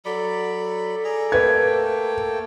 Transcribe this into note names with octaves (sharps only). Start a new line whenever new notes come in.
F#3 A4 D5 B5
G#4 D5 A#5
A3 A#3 B4 G5 G#6